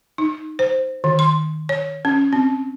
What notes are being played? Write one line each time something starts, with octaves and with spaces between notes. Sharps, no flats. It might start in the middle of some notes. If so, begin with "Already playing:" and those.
D#4
C5
D#3
C6
C#5
C#4
C4